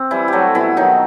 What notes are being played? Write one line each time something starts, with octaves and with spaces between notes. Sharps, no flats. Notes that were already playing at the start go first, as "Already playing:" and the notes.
Already playing: C4
E3 G3 E4
F#3 A3 F#4 G4
B2 E3 E4
D#3 F#3 D#4